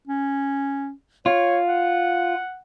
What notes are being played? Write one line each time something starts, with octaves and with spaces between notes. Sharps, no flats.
C#4
F4 C#5
F#5